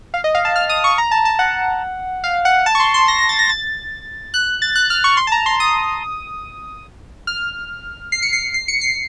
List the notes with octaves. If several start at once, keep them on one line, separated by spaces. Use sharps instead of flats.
F5
D#5
F5
A5
F6
D#6
C#6
A#5
A5
A5
F#5
F5
F#5
A5
C#6
C6
C6
A#6
A#6
A6
A#6
A6
F#6
A6
F#6
F6
C#6
C6
A5
A#5
C6
D#6
F6
C7
C#7
C7
C7
C#7
C7